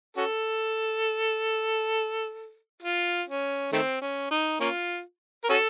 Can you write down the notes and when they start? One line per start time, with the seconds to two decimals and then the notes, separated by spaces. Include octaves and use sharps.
0.17 C#4 F#4 A4
2.83 F4
3.28 C#4
3.72 D#3 A3 C4
4.01 C#4
4.31 D#4
4.60 A#3 C#4 F4
5.44 A#4
5.49 C#4 F#4 A4